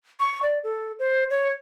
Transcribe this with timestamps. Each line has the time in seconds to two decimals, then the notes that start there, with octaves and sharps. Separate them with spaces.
0.20 C#6
0.42 D5
0.64 A4
0.99 C5
1.30 C#5